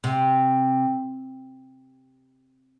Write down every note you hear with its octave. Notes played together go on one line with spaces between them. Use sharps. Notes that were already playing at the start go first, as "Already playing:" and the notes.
C3